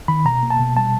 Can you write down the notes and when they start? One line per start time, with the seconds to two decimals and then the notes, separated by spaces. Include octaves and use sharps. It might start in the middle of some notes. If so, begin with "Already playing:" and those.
0.08 D#3 B5
0.25 B2 A#5
0.43 A#3
0.50 A5
0.60 B2
0.77 G3 A5